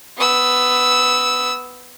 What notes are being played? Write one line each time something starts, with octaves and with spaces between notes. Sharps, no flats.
B3 E6